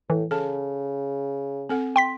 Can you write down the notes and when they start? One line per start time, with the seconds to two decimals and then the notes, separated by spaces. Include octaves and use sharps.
0.10 A2 E3
0.31 C#3 A4 A5
1.69 C4 A4 F#5
1.96 G5 C6 B6